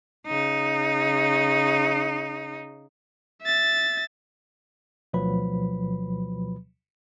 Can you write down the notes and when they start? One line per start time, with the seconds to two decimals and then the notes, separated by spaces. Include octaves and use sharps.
0.27 C#3 D#4
3.42 E5 A6
5.13 D2 B2 F3 F#3 B4 B5